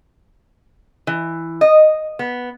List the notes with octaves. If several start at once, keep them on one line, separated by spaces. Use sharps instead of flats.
E3
D#5
B3